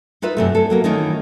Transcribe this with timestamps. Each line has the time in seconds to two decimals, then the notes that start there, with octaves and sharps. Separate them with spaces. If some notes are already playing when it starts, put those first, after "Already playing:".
0.22 D#4 F4 B4 E5
0.37 F#2 C3 A3
0.55 E4 A4
0.70 F#3 A#3 B3
0.84 D#3 E3 A3 C#4 D#4 F4